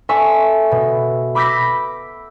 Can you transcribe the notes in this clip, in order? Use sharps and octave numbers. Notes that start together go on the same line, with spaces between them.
A4 E5 G#5 C#6
B2
B5 D6 E6 G6 A#6 B6